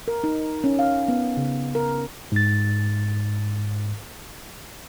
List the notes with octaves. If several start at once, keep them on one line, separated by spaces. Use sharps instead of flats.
A#4
D#4
C#4
F5
B3
C#3
A#4
G#2 A6